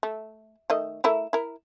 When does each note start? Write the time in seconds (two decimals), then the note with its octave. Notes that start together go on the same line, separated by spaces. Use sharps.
0.03 A3
0.70 D#3 A3 D#5
1.04 A3 E4 A#4
1.33 E4 A#4